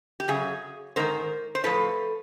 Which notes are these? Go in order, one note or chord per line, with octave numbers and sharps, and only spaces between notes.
G4
F#2 C#3 G#4
G#2 D#3 A#4 C5
C5
A2 F3 A4 B4